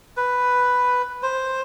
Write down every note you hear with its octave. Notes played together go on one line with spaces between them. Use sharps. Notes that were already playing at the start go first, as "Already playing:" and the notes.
B4
C5